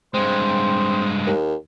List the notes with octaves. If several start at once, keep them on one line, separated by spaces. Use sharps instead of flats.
G2 G#3 C4 C5
D#2